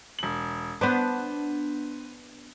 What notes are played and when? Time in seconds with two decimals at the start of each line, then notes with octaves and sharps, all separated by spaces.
0.19 E1 F#7
0.81 B3 D4 B4 C5